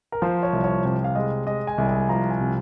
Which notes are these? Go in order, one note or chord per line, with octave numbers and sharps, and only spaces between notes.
A#4
F3 C5
C#5
C2
C#5
C3
F5
G#3 D#5
G#3 D#5
G#5
C2
G#5
F3 A#5
G#5
C3